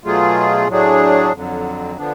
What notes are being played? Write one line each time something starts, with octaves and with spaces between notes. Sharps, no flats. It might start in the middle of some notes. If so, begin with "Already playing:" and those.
B2 F#3 A3 F4 G#4
A2 F#3 A3 D4 G#4
F2 D3 F#3
D3 F3 B3 D4